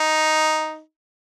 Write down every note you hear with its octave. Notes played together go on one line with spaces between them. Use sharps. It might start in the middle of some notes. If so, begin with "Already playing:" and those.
Already playing: D#4